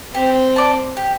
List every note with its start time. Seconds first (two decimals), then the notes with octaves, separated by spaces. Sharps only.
0.14 C4 G4
0.56 D5 A5
0.97 G4